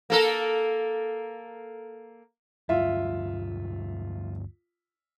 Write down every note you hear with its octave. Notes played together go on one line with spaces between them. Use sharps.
A#3 A4 A#4
D2 G2 F#3 F4 E5